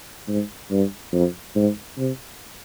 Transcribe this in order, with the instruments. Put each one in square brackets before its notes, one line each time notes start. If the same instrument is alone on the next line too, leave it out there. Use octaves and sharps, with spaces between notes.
[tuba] G#2
G2
F2
G#2
C3